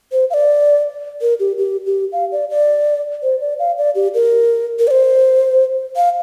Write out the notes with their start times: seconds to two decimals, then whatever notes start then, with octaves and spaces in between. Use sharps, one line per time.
0.12 C5
0.30 F5
0.34 D5
1.21 A#4
1.40 G4
1.58 G4
1.86 G4
2.12 F5
2.32 D5
2.50 D5
3.23 C5
3.41 D5
3.59 F5
3.78 D5
3.95 G4
4.14 A#4
4.79 A#4
4.87 D5
4.91 C5
5.96 F5